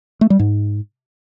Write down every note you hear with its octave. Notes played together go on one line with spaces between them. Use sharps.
A3
G3
G#2